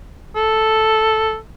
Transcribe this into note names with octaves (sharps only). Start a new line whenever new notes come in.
A4